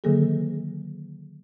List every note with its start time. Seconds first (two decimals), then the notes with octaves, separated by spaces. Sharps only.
0.04 D3 D#3 F#3 A#3 G#4 A4